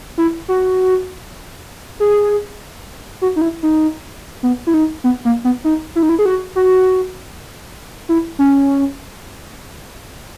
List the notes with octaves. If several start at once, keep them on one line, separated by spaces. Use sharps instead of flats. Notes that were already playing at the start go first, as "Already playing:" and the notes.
E4
F#4
G#4
F#4
D#4
E4
D#4
B3
E4
D#4
B3
A#3
B3
D#4
E4
D#4
E4
G#4
F#4
F#4
E4
C#4